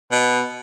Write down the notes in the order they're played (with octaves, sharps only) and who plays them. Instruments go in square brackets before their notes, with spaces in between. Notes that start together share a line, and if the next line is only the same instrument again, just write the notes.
[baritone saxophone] B2